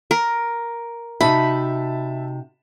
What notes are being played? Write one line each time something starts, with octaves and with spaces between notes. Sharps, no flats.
A#4
C3 D#4 F#4 E5 A5 B5